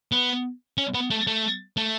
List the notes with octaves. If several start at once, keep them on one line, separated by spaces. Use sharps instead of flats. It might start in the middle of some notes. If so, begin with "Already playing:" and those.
B3
C#4
B3
A3
A3
A3